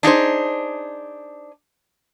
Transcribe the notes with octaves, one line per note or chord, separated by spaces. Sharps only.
D4 D#4 G#4 C5